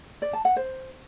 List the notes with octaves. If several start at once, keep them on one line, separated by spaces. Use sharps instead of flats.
D5
A5
F#5
C5